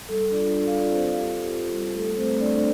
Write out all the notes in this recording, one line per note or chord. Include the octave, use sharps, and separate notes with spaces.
G3 A4
D4 F4 D5
G3
F4 F5
D4 F4 D5
C4 C5
F4 A4
G4
F4
G4
F4
G3
A3 A4
A3 C4 C5
A3 D4 D5